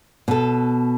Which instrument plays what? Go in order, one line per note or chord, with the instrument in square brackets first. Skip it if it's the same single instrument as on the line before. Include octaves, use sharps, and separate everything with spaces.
[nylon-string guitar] B2 A4